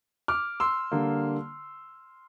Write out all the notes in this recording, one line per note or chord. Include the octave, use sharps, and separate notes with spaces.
D6 F6
C6 E6
D3 G3 A#3